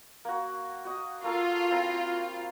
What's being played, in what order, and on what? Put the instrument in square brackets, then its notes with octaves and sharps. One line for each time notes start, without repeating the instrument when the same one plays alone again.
[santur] A#3 F#4
F#4 D#5
[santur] A#3 A4 A#4 [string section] F4
[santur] C4 E4 A#5